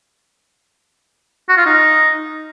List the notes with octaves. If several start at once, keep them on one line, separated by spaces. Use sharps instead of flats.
F#4
F4
D#4